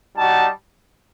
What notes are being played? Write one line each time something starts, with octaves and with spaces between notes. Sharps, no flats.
G3 D#4 F#4 A5